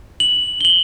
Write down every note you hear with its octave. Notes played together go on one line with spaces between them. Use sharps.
F#7
F#7 G7